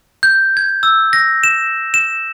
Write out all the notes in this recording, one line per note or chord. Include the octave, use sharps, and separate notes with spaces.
G6
G#6
E6
A#6
E7
E7